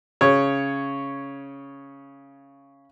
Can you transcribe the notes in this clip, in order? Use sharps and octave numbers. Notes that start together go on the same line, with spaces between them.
C#3 C#5